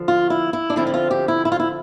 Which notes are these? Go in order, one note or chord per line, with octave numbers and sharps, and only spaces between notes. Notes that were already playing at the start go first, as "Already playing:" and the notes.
Already playing: D3 F3
F4
E4
E4
D4
D3 F3 C4 E4
E4
F4
G4
E4
E4
F4
E4